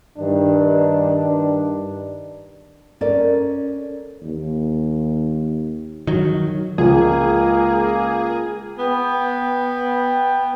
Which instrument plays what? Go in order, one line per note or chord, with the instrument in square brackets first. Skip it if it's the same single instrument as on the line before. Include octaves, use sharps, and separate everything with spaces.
[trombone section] G2 D#3 D4
[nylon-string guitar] C#4 A4 A#4 D5
[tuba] D#2
[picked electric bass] D#3 F#3
[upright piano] C#2 [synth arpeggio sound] C#3 F3 [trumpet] A#3 [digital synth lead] G#4
[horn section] B3 G5